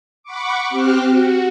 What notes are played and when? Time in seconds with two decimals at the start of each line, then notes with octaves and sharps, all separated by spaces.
0.23 F#5 B5 C#6 D6
0.69 C4 G4 F6 F#6
1.09 F#4